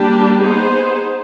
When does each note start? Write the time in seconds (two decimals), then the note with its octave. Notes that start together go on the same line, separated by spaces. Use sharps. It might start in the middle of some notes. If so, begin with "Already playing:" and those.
Already playing: G3 A#3 D4 G4
0.38 B3 D#4 G#4 C5